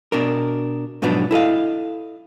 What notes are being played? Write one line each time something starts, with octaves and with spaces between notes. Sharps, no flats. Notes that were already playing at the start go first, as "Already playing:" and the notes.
B2 D4 A#4
G#2 B2 F3 F#3 B3 D4
E4 A4 D#5 F5